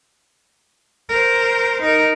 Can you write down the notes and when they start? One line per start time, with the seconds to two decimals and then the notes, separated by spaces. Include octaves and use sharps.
1.09 A#4 C5
1.81 D#4 A#4